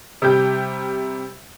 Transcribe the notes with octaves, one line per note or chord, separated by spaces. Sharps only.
C3 G3 G4 G6